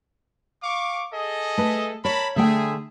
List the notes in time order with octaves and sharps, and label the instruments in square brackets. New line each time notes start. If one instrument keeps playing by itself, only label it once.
[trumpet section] F5 C#6 D6
G#4 A4 D#5
[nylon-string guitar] A3 B4
[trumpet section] A#4 A5 B5 [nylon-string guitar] C#5
[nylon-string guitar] D3 A3 G5 [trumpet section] G#4 E5